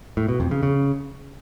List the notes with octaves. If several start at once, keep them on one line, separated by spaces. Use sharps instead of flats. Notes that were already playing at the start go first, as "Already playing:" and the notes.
A2
B2
F2
C#3
C#3